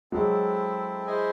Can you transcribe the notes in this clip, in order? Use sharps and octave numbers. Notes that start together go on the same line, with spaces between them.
F#3 G#3 C4 E4 A4
E4 G#4 C5 D#5 G#5